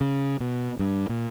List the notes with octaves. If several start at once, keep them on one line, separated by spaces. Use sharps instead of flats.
C#3
B2
G2
A#2